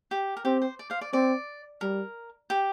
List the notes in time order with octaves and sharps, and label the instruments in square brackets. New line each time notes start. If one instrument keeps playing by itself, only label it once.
[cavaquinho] G4
A#4
[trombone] C4 [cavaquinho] G4
[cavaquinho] C5
D5
C5 F5
D5
[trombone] C4 [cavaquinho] D5
[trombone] G3 [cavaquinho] A#4
[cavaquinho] G4